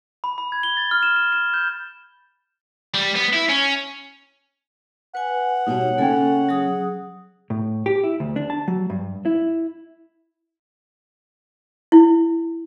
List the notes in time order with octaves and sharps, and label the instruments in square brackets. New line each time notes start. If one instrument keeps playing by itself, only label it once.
[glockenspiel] B5
B5
G#6
G7
A6
F6
E7
E7
E7
G6
[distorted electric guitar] G3
B3
E4
C#4
[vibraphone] B4 G#5 [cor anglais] F#5
[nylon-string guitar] B2 G3 [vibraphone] D#4 C#5
[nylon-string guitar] C#3 C#4 G5 [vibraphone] A#3 A4 G#5
[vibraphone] F#3 G#4 D#6
[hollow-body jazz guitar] A2
G4
E4
D2
D4
A5
F#3
G2
E4
[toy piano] E4